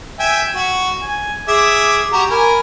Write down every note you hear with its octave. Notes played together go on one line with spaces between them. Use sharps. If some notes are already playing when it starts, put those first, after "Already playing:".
E5 G5 G#5
F#4
G#5
G#4 E5 D6
F#4 G4 A#5
A#4 G#5 B5